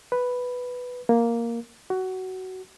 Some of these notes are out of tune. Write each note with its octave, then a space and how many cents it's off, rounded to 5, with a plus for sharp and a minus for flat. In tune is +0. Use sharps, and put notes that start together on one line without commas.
B4 +0
A#3 +0
F#4 +15